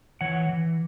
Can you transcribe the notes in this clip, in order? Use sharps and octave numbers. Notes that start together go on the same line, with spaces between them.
E3 C#5 F#5
E3